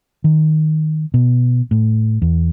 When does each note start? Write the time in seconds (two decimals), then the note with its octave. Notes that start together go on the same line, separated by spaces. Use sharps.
0.24 D#3
1.14 B2
1.71 A2
2.22 E2